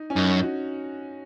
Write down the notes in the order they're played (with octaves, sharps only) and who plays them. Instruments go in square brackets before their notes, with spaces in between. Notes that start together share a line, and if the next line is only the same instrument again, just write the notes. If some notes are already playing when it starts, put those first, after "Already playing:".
Already playing: [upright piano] D#4
C#4
[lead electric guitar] F#2 [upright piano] D#4
[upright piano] F#4